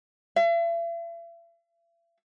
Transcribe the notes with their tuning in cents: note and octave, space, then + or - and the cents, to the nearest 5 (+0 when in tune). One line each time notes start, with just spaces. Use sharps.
E5 +45